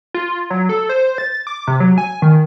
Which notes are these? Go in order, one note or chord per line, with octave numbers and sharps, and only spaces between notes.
F4
F#3
A4
C5
A6
D6
C3
F#3
G#5
D#3